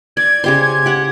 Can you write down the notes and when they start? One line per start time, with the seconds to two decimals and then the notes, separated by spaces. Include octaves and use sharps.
0.17 D5 G#6
0.44 C#3 G4 C5
0.86 G4 F#5